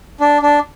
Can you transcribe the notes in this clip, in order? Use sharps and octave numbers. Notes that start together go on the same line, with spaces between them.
D4
D4